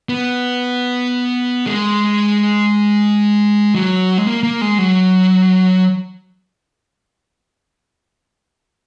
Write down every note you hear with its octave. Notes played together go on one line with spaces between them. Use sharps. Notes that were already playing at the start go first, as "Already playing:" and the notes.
B3
G#3
F#3
G#3
A#3
A#3
G#3
F#3